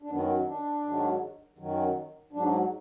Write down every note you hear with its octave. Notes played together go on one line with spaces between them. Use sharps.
D4
F#2 D#3 F#3 B3
D4
G#2 D#3 F#3
F#2 D#3 F#3
G#2 F#3 D4